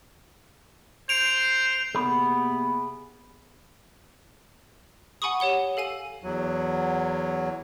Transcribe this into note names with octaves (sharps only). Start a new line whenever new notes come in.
C5 D7 F7
C3 A#3 B3 G#4 B5
F#5 G#5 B5 C#6 D#6
G4 C#5 F#5 G7
A4 F5 G#5 D#7
E2 F#3